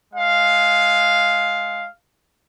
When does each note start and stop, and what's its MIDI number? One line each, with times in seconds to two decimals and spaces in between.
0.14 1.89 56
0.14 1.89 77